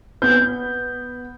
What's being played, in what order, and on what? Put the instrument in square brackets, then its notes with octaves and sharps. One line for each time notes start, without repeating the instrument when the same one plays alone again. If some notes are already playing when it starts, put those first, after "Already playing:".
[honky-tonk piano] B3 [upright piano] G6